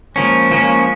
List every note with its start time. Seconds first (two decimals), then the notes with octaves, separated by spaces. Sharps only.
0.15 F3 G#3 A#3 C#4
0.51 F3 A#3 C#4